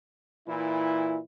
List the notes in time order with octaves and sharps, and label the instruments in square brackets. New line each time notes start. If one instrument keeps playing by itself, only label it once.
[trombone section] A#2 E3 E4